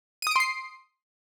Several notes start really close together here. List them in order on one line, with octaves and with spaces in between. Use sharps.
D#7 D#6 D7 C6 C7